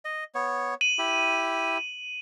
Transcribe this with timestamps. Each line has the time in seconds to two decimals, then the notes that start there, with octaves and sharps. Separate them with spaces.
0.05 D#5
0.35 B3 C#5
0.81 D#7 F#7
0.98 E4 G4